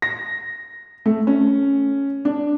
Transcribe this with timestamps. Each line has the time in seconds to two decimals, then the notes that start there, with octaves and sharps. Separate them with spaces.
0.02 A#6
1.06 A3
1.27 C#4
2.25 D4